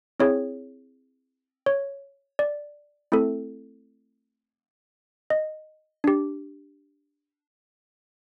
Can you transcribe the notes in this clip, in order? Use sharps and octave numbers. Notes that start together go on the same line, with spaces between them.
C4 E4 G#4 C#5
C#5
D5
A3 C4 E4 A4
D#5
D4 G4